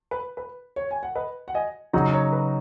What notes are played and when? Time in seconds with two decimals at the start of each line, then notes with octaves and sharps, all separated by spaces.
0.11 B4
0.37 B4
0.76 C#5
0.91 G#5
1.03 F#5
1.15 B4 D#5
1.48 F#5
1.54 D#5 G#5
1.93 C#3 F#3 D#4 F#4 C#5 F#5
2.13 C#5
2.32 B4